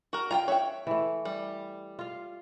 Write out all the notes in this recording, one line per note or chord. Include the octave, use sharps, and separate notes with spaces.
F#4 A#4
F4 G5 G#5 A#5
C#5 E5 F#5 G5
E3 A3
G3
F4 F5